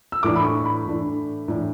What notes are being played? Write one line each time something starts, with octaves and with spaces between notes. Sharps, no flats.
E6
A2 E3 A3 D4 D6
B5
C#6
B5
A2 E3 A3 D4
A2 E3 A3 D4